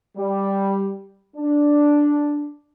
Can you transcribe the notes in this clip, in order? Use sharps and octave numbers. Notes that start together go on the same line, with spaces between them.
G3
D4